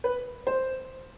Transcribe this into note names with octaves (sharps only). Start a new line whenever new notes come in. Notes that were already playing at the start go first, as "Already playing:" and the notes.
B4
C5